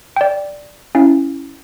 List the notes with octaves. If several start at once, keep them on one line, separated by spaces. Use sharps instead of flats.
D5 G5
C#4 E4 F5